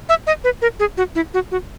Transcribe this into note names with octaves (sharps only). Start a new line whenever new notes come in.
E5
D#5
B4
A#4
G#4
F#4
E4
F#4
F#4